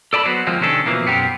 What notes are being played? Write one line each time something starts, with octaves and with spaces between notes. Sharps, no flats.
A4 D5 A5 B5
F#3 B3 F#4 C5
F3 G#3 A#3 C4
C3 D#3 C#4 D4 A4
B2 E3 F3 A#3
B1 F#2 B3 C4 G4 A#4